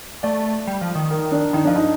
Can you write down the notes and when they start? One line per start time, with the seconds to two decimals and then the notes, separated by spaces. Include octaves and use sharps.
0.23 A3 D5
0.67 G3
0.81 F3
0.95 D#3
1.11 A#4
1.32 D4
1.53 D#3 D#4
1.65 F3 D4
1.76 D#4